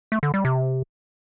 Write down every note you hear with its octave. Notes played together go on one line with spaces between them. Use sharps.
A3
D3
G3
C3